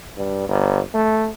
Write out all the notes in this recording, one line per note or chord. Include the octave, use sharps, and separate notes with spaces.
G2
G1
A3